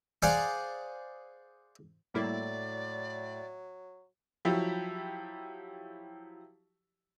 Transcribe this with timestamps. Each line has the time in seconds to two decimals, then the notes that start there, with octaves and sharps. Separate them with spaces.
0.22 G#4 C5 D5 F5 F#5 G#5
2.14 A2 F#3 G3 A#3 E4 D5
4.45 F3 F#3 E4 G4